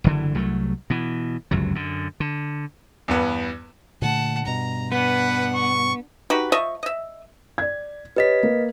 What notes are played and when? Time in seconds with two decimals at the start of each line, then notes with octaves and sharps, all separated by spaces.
0.04 F#1 D3 E3
0.35 C2 F#3 A3
0.90 B2 E3
1.51 G1 C#2 F#2 F#3
1.75 F#2 D3
2.20 D3
3.08 E2 G2 B3
4.02 A#2 D3 A3 F#5 A5
4.46 G2 B2 A#5
4.92 B3 D4 B4 F#5
5.55 C#6
6.30 D#4 F#4 G4 B4
6.52 F3 D#5 E5 C#6
6.83 D#5 E5
7.58 D5 G#6
8.16 G4 B4 C#5 D#5 B6
8.43 A#3